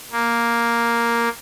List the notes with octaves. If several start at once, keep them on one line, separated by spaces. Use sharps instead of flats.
A#3